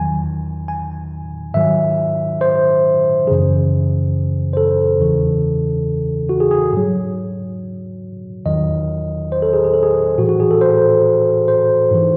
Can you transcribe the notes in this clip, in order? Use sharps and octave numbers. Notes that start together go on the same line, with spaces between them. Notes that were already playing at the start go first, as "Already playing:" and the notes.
Already playing: E2 D#3 F#3 G#5
G#5
G#2 D#3 F#3 E5
C5
F#2 C#3 E3 G#4
C5
A4
E2 C#3 E3
F#4
G#4
G#4
G#2 F#3
E2 D#3 F#3 D#5
C5
A4
G#4
G#4
A4
G#4
A2 E3 F#4
F#4
G#4
A4
C5
C5
G#2 E3